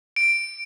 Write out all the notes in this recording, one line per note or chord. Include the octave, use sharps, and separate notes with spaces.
D7